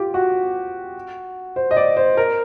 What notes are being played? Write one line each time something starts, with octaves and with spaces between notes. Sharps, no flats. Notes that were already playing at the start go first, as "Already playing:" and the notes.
Already playing: F4 G4
F#4
C5
D#5
D5
C5
A#4